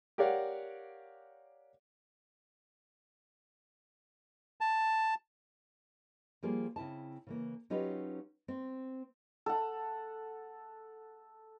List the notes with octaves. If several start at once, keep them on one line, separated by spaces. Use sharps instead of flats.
G4 A#4 C#5 D5 F5 F#5
A5
F3 G3 A#3 F4 G#4 D5
C#3 C4 E4 A5
C#3 E3 A#3
F#3 C#4 D#4 F4 G4 B4
C4
A4 F#5